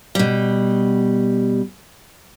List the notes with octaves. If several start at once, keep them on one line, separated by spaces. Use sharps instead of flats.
B2 G3